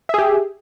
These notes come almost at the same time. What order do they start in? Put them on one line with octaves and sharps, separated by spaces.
E5 G#4 G4